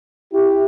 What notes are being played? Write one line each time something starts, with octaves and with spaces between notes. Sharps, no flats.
E4 G4